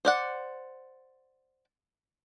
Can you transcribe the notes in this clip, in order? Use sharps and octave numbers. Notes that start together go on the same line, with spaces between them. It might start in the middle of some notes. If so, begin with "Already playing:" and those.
C5 D5 F#5